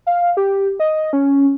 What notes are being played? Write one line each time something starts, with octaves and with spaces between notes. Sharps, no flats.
F5
G4
D#5
C#4